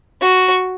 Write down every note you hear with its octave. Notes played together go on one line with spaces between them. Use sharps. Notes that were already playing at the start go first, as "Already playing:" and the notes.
F#4